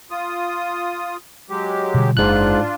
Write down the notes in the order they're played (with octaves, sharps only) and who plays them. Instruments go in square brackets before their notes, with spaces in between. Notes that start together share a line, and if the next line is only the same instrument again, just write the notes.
[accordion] F4 D#6
F#3 G#3 G4
[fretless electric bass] B2 D3 G3
[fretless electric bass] F#1 [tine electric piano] G#2 F#6 [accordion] D4 F4